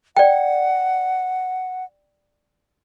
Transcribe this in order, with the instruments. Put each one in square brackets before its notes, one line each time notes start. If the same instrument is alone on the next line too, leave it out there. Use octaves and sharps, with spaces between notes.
[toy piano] D5 G5 [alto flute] F#5